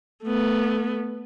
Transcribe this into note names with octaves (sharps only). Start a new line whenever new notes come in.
A3 B3